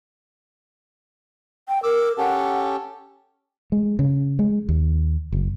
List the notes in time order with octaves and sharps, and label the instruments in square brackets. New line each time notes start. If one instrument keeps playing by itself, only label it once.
[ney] G5
[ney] A#4 [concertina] D6 E6
[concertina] C#4 G4 A4 [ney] F#5
[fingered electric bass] G#3
C#3
G#3
D#2
F#1